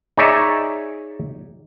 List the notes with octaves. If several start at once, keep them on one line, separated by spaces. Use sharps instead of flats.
D#4 G#4 C#5 D5 E5